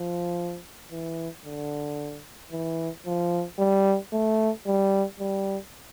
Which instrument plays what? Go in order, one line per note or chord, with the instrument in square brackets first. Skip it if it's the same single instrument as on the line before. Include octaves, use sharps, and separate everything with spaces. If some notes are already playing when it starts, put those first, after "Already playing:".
Already playing: [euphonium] F3
E3
D3
E3
F3
G3
A3
G3
G3